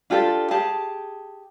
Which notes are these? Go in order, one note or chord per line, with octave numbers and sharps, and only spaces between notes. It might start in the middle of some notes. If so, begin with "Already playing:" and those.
D4 F4 G4 A4
G4 G#4 A5